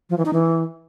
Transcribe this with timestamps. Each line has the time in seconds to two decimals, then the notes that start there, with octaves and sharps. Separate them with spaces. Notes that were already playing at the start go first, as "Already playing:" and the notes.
0.10 F3
0.18 E3
0.25 D#4
0.33 E3